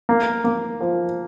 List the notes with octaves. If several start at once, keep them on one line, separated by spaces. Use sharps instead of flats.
A#3
A#3
F3